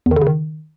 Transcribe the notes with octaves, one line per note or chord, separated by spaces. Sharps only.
E2
D#3
D3
C#3
D#3